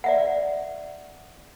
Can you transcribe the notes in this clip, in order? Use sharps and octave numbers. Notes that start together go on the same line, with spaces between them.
D5 E5 F#5